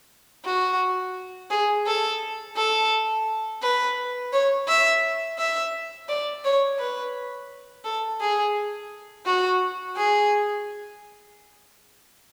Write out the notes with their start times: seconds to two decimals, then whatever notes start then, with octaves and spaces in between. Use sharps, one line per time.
0.45 F#4
1.50 G#4
1.86 A4
2.56 A4
3.62 B4
4.33 C#5
4.68 E5
5.38 E5
6.09 D5
6.45 C#5
6.79 B4
7.84 A4
8.20 G#4
9.26 F#4
9.97 G#4